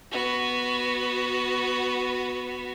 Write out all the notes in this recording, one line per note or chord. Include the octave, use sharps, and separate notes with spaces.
B3 F#4